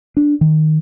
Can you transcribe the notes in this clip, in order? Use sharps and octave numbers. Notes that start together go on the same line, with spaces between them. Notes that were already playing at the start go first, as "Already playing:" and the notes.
D4
D#3